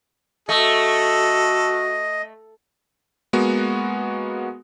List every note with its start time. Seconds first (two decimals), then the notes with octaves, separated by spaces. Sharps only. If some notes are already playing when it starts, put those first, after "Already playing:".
0.49 A3 F#4 A4 D#5
3.33 G#3 A#3 B3 F#4